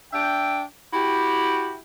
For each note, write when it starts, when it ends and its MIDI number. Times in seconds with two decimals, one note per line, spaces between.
0.13 0.62 62
0.13 0.62 76
0.13 0.62 79
0.93 1.79 64
0.93 1.79 66
0.93 1.79 67